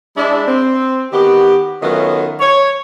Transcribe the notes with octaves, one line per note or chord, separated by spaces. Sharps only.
G#3 D4 E4
C4
D#3 B3 F#4 G4
D#3 F#3 A3 B3 C#4 F4
C#5